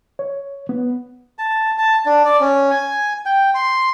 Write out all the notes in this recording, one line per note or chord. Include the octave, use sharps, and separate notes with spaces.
C#5
B3
A5
A5
D4
D5
C#4
G#5
G5
C6